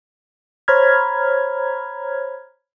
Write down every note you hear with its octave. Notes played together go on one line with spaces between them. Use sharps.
C5 C#5 A#5 B5 F6 G#6